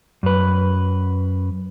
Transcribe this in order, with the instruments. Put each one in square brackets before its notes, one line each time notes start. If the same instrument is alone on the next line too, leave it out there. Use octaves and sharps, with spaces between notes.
[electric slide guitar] F#2 B4